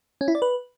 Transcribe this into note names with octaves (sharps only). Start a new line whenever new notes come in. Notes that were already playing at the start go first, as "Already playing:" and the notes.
C#4
E4
D5
B4